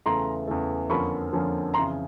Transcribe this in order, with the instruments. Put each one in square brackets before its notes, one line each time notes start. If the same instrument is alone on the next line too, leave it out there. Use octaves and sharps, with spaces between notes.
[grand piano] E2 C#3 E3 A3 [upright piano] A#5 C6
[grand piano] E2 C#3 E3 A3
[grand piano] F2 D3 F3 A#3 C#4 [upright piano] B5 C#6
[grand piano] F2 D3 F3 A#3 C#4
[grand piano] F2 C#3 E3 [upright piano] A#5 C6